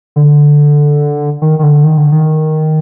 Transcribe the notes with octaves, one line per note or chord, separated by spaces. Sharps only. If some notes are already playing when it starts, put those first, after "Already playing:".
D3
D#3
D#3
D3
D#3
D3
D#3